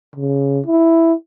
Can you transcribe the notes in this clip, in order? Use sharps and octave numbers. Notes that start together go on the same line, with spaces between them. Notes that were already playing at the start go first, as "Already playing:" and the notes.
C#3
E4